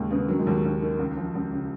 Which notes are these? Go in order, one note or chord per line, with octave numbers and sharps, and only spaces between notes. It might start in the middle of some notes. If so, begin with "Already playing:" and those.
Already playing: D#2 C#3 G#3 A#3
C#3 B3
D#3 F#3
G#3
D#2 F#3
D#2
D#3
C#2
F3
C#2
C#3